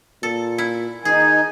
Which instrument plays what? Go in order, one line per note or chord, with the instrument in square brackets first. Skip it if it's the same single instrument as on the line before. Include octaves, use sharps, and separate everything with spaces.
[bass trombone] A#2 [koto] A4
[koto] E4
[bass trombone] D#3 [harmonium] D#4 [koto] G#4 [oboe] G#5